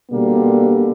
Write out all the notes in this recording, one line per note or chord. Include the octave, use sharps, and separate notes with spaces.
B2 D3 G3 A#3